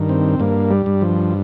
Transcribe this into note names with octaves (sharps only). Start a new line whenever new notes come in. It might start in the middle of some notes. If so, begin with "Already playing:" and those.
Already playing: G2 D#3
C4
G2 A#3
G3
G2
F3